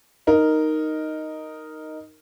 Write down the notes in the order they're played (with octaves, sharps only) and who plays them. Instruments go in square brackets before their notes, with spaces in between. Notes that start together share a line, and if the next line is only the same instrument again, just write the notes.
[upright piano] D#4 A#4